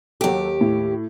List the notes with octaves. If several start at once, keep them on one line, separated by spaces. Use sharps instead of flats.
D#2 F#3 G4 A4
A2